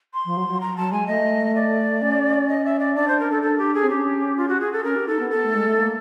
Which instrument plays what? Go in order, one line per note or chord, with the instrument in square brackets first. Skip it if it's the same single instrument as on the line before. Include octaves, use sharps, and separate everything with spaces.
[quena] C6
[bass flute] F3
F#3
F#3
[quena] A#5
[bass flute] F#3 [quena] A5
[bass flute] G#3 [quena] G#5
[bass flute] A3 [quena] D#5
[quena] D5
[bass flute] C#4
[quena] D#5
E5
D5
[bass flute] D4 [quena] D5
[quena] C5
A#4
A4
A4
G4
G#4
[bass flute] C4
[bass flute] C#4 [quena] G4
[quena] F4
F#4
G#4
A4
[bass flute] C#4 [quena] A#4
[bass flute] G4
[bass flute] D#4 [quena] A4
[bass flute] B3
[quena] A4
[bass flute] A3
G#3
A3
A#3